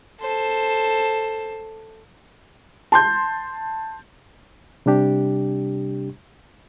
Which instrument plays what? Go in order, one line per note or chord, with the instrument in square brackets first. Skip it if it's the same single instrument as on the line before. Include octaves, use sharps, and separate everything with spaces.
[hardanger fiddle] A4 C5
[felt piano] A5 C6 G6
[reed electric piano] C3 G3 D4 G4